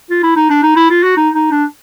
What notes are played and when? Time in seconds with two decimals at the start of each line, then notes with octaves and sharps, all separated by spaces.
0.11 F4
0.23 E4
0.36 D#4
0.50 D4
0.63 D#4
0.76 E4
0.90 F4
1.03 F#4
1.17 D#4
1.35 D#4
1.52 D4